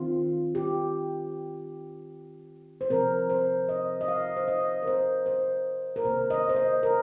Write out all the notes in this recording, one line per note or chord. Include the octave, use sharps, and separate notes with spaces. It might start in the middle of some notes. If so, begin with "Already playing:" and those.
Already playing: D#3 C4 F4
G4
C5
C3 F3 C4 A#4
C5
D#5
D#5
F5
C5
D#5
A#4
C5
C5
A#4
C3 D#3 A#3 C5
D#5
C5
D#5
A#4